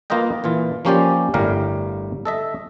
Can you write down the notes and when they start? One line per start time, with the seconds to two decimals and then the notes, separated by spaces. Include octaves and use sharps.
0.10 A#3 F4 A#4 B4 D#5 G5
0.44 A#2 E3 F4
0.85 F3 A#3 C#4 G4 C5 D5
1.34 G1 A2 G3 A#4 F5
2.25 A4 D#5 E5